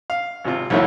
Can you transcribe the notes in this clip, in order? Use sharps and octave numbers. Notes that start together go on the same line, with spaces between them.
F5
G#1 C3 F4
C2 F2 A2 D#3 F#3 E4